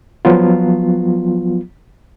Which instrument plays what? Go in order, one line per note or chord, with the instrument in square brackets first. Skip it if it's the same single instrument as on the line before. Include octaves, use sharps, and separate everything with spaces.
[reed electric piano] F3 F#3 B3 F4